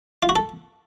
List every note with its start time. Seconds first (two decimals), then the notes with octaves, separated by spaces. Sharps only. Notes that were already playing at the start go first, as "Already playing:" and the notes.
0.23 F4
0.29 F#4
0.36 A4